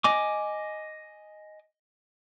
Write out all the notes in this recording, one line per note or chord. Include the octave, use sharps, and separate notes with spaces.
D#5 G#5 D6